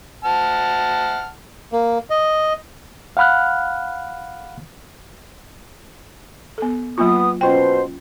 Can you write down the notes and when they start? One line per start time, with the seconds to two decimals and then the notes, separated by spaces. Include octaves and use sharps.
0.25 F#5 A5 F6
1.72 A#3
2.10 D#5
3.17 F5 F#5 B5 F6 F#6
6.58 B3 A4
6.98 F#3 A#3 B3 F4 D#6
7.41 B2 C#4 F4 C5 G5